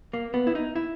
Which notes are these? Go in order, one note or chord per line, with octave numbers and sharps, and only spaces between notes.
A#3
B3
E4
D#4
E4